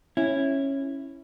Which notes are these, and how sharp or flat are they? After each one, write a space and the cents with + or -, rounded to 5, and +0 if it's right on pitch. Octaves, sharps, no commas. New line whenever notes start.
C#4 -15 E4 +0